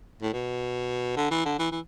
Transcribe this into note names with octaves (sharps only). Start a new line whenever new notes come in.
A2
B2
D3
E3
D3
E3
E3